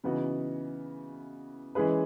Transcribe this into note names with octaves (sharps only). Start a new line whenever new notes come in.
C#3 E3 B3 D#4 F#4
E3 G#3 C#4 G#4 B4